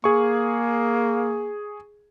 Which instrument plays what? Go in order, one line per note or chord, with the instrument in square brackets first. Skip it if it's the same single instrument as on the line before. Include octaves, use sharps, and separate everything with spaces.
[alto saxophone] A#3 [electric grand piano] G#4 C#6